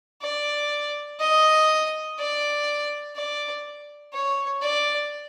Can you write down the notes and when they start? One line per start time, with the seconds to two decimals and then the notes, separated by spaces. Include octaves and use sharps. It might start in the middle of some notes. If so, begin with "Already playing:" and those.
0.22 D5
1.20 D#5
2.18 D5
3.16 D5
4.13 C#5
4.62 D5